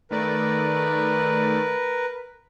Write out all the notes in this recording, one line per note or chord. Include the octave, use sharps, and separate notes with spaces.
D#3 A3 A#4 B4 D5